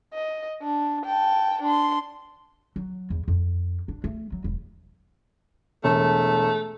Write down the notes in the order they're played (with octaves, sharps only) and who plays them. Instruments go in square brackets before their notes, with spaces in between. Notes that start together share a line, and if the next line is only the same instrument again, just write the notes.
[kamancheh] D#5
D4
G5 A5
D4 C6
[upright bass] F#3
E2
F2
D4
A3
F#3
E1
[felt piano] E1 [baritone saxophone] A3